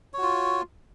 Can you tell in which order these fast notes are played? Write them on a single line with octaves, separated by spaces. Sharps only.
C#5 F#4 F4